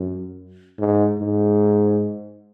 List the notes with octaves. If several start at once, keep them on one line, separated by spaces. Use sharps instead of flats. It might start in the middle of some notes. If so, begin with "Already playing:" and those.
Already playing: F#2
G#2
G#2